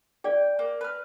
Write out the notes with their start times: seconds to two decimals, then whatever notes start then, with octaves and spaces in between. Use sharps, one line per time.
0.24 G#4 D5 G5
0.59 A#3
0.81 B4 F6